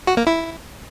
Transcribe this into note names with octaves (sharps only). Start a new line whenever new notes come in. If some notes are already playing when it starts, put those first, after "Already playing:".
F#4
A#3
E4